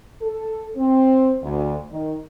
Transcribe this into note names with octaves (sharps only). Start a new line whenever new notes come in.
A4
C4
D2
D#3